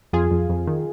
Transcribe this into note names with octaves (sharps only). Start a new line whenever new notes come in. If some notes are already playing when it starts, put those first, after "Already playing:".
F2 F4 G#4
F2
F2
D#3